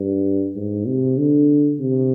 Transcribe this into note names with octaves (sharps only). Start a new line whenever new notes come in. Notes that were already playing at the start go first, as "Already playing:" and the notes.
Already playing: G2
G#2
C3
D3
C3